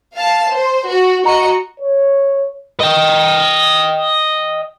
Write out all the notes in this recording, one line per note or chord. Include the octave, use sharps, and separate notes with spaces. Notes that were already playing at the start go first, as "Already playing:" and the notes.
F5 A5
C5
F#4
F#4 D#5 A#5 C#7
C#5
D#5 G5